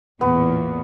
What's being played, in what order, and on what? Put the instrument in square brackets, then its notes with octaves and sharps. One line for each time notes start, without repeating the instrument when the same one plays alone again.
[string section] A1 E2 A#2 [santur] B3